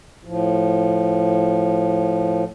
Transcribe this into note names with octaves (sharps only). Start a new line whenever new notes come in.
A2 F3